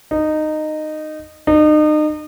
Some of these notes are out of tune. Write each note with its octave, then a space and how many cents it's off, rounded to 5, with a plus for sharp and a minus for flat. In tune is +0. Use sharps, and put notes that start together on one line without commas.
D#4 -15
D#4 -35